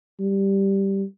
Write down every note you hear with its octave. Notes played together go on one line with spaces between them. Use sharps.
G3